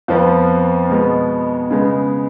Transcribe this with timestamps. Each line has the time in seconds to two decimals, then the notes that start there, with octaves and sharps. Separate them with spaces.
0.08 F2 F3 B3 F4
0.90 B2 G#3 B3
1.71 C#3 G#3 B3